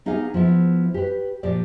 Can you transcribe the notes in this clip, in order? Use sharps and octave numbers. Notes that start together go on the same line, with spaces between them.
B3 D#4 G4 G#4 F5
F3 B3 E4
G4 B4
A#2 F3 G4 D5